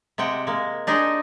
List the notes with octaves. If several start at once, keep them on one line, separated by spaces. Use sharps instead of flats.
C3 G#3 F#5 G5
G#3 A#3
D4 D#4 G#4 C5